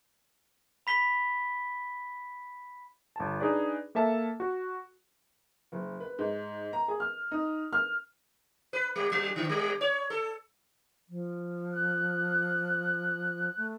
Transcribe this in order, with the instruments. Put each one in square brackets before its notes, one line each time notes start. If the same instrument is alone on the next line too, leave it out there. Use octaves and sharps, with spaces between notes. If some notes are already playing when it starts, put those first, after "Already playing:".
[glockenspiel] B5 B6 G7
[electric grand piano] G1 A5
D4 D#4 G#4 B4 D5
A#3 A4 E5 A5
F#4
[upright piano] F#1
B4
G#2
A#5
G#4
F6
D#4
F6
[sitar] B4
G3
F#3
D3
G3
C#5
A4
[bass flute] F3
[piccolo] F#6
[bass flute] A3